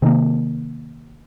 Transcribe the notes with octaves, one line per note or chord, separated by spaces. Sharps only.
C3 D#3 A#3